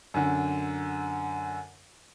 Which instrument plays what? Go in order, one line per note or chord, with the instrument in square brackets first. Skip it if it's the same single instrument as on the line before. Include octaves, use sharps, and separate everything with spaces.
[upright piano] F#2 D3